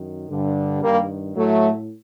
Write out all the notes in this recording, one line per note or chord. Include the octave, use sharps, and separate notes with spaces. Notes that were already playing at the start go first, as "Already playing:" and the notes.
Already playing: F#2 D#3
G2 D3
G2 D#3 G3 A#3
A2 F#3 A3